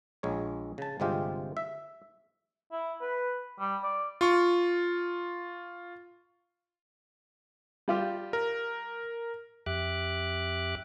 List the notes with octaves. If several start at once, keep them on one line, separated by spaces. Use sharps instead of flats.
A#1 G#3 C#5
C#3 A5
G1 C3 G#3 C4 F4 G4
E5
E4
B4
G3
D5
F4 C#6
G3 F4 G4
A#4
F2 G4 E5 D6 F#6